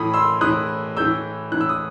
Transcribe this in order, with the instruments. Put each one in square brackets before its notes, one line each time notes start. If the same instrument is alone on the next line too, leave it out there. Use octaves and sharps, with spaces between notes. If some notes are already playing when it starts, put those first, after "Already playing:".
Already playing: [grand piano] A2 E3 B5 D#6
C6 E6
A2 E3 D#6 F#6
A2 E3 E6 G6
A2 E3 F#6
E6
D#6